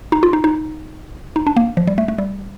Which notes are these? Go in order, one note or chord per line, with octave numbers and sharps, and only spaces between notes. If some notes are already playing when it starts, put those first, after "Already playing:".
D#4
F4
D#4
D#4
D#4
D4
A#3
F3
G3
A3
A3
G3